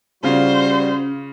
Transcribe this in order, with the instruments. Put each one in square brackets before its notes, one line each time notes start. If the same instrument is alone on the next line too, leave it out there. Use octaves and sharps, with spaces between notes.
[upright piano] C#3 F4 [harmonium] G3 F#4 [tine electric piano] C#4 [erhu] C5